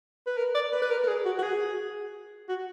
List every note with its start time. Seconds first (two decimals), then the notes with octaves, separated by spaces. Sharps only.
0.27 B4
0.38 A#4
0.55 D5
0.72 B4
0.82 B4
0.91 A#4
1.03 A#4
1.08 G#4
1.25 F#4
1.39 F#4
1.43 G#4
2.49 F#4